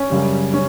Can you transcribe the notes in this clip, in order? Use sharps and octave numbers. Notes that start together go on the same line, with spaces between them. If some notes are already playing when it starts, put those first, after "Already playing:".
Already playing: C#4
F#2 C#3 G3
C#4